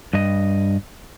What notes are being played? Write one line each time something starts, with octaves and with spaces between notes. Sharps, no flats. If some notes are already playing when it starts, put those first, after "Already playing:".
G2 D#5